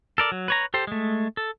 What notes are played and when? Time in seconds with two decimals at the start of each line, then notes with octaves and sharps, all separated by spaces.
0.18 A4 A#4 D5
0.32 F#3
0.48 B4 C#5 A#5
0.74 G4 A4 C5
0.87 G#3 A3
1.37 A4